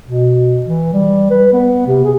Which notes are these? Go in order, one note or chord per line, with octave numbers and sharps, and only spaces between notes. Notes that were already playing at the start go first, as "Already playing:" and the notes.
B2
E3
G3
B4
B3
C3
G#4